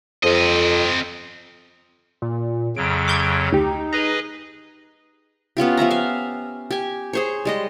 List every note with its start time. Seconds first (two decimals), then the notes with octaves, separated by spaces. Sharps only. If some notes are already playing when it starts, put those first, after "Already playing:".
0.23 F2 C4 D#5
2.22 A#2
2.77 F2 C#3 F#3 D7
3.08 D6 G6 G#6
3.52 D2 D#4 G4
3.93 G#4 B4 D#5 A#5
5.57 B3 C#4 F4 G4
5.77 F3 B3 E5 A#5
5.91 E5 F5
6.71 G4 G#5
7.13 G#4 C5 C#5
7.45 G3 G#3 D#5